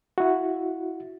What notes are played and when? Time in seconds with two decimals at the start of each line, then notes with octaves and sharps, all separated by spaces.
0.18 E4 F#4